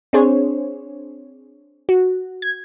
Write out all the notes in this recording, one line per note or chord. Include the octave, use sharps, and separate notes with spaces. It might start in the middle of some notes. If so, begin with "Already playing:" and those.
C4 D4 G#4 C5 C#5
F#4
G#6